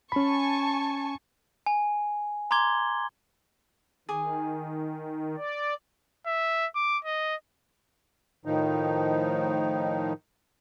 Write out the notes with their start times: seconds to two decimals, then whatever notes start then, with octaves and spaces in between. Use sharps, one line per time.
0.12 C#4 G#5 A5 B5 C#6
1.66 G#5
2.51 A#5 C6 D6 G#6 G7
4.09 D#3 G#4 G#5 D6
5.37 D5
6.26 E5
6.75 D6
7.04 D#5
8.45 A2 D#3 F3 D#4